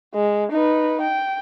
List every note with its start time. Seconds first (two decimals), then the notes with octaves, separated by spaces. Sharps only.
0.14 G#3
0.51 D#4 B4
1.01 G5